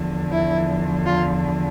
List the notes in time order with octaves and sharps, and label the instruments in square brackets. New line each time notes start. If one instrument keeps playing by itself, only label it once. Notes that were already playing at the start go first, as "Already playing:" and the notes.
Already playing: [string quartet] E2 D3 F3
E4
F4